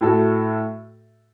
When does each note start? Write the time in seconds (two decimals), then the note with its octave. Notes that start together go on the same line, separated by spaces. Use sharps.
0.01 A2 A3 F#4 A4